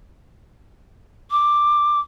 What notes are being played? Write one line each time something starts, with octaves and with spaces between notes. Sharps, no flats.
D6